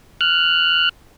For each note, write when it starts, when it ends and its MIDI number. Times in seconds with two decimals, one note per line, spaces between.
0.21 0.89 89
0.21 0.89 90